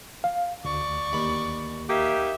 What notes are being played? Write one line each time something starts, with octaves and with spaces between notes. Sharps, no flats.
F5
D2 D5 C#6
D#2 B5
A#3 D#4 G4 E5